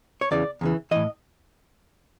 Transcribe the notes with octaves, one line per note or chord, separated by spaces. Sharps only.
C#5
E2 C#3 E3 D5
E2 C#3 E3
A2 E3 D#5